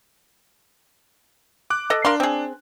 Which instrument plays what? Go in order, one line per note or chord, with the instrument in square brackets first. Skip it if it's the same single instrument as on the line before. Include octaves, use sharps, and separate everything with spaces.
[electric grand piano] D6 F#6
[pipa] A4 D#5
[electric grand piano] D4 [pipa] A#4 F5 C6
[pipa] C4 G#4